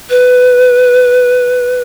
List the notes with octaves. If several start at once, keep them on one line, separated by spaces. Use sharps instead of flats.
B4